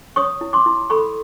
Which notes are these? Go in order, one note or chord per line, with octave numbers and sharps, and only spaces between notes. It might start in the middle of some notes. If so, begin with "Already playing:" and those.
C#5 C#6 D#6
E4
C6 D6
E4
A4 B5 C#6